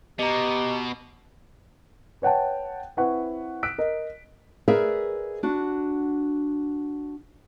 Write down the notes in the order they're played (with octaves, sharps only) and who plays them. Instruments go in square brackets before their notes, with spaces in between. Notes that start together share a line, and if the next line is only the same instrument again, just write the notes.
[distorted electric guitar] B2 [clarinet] G4 [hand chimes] D#5 A#5
[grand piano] B4 C#5 F#5 G5 A5
C4 E4 B4 F#5 C#6
E6 F#6 B6 D7
A#4 D#5
[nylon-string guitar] G#4 A#4 B4 D5 E5
D4 F#4